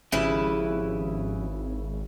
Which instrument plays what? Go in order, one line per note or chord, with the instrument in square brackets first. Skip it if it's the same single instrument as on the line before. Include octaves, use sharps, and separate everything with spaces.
[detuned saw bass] G#1 [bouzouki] C#3 E4 B4 [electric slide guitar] F3 C#4 G4